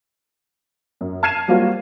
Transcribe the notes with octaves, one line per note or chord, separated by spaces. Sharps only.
F#2
A5 F6 G#6 C7 D#7 E7
F#3 G3 A#3 C4 F4 F#4